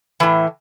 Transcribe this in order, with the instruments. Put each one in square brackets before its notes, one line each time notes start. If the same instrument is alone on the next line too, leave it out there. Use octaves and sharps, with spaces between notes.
[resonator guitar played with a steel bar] A2 E3